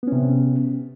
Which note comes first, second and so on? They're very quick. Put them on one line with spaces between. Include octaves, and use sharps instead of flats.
B3 C#4 C3